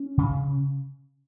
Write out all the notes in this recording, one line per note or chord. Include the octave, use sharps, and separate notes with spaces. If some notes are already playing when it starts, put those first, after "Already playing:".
Already playing: C#4
C#3